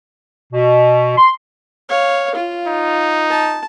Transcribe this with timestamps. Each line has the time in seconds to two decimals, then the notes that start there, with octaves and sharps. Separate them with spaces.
0.53 B2
1.18 C6
1.89 C#5 F5
2.35 F4
2.67 D#4
3.30 A5